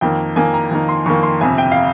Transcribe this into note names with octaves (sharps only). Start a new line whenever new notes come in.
F2 D#3 A#3 G5
F2 D#3 A#3 G#5
A#5
F2 D#3 A#3
C6
F2 D#3 A#3 C#6
C6
G1 F2 C3 G#5
G5
F5